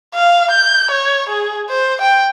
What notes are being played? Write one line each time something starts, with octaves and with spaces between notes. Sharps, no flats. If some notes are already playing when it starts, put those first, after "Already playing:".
F5
G6
C#5
G#4
C5
G5